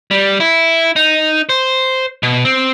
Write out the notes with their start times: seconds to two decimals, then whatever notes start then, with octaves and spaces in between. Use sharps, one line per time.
0.11 G3
0.40 E4
0.96 D#4
1.49 C5
2.23 B2
2.45 C4